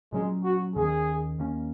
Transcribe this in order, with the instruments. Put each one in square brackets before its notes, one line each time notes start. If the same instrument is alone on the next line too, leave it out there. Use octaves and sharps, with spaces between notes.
[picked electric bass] A#2 F#3 C#4 [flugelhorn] G#3
[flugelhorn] F#4
[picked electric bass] D#2 D#3 A#3 [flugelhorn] G#4
[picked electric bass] C#4
D#2 D#3 A#3 C#4